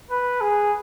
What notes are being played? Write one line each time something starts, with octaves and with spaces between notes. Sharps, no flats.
B4
G#4